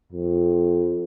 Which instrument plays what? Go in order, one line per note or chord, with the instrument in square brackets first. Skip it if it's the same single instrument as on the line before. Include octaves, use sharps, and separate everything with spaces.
[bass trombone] F2